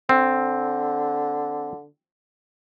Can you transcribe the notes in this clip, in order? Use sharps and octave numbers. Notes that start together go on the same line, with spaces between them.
D3 C4